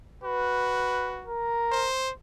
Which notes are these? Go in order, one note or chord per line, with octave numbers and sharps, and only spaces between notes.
F#4 B4
A#4
C5